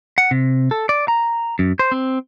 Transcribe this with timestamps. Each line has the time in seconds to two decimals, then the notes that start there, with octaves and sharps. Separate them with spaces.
0.18 F#5
0.31 C3
0.71 A4
0.89 D5
1.08 A#5
1.59 F#2
1.79 C5
1.92 C4